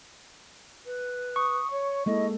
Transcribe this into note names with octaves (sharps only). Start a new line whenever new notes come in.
B4
C#6 D#6
C#5
G#3 A#3 E4 A4 D#5